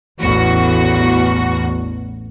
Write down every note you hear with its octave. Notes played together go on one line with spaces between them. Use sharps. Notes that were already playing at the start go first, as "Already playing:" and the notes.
A1 E2 F#4